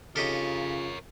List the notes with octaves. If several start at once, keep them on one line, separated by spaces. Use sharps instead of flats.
C#3 D#4 F4 G4 A4 A#4 C#5